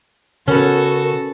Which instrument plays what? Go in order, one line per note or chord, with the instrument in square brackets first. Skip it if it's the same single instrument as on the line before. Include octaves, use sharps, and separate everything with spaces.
[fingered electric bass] C#3 [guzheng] B3 C#4 [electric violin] F#4 A4 [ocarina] A#4